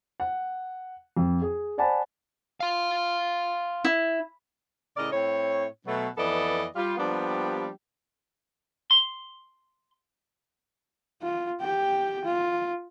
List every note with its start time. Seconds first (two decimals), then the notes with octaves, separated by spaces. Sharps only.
0.20 F#5
1.17 F2
1.42 G#4
1.78 C5 D5 F#5 G#5 A5 B5
2.60 F5 C6
3.85 E4
4.97 A2 C#3 A#4 D5 D#5
5.12 A2 C4 E4 C#5
5.86 B2 F#3 A3
6.17 F2 E3 B3 A4 D5 D#5
6.76 G3 F4
6.98 F3 G3 A#3 B3 D4 G4
8.91 C6
11.22 F4
11.61 G4 G5
12.25 F4